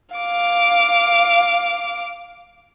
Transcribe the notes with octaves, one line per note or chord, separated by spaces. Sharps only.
F5 D6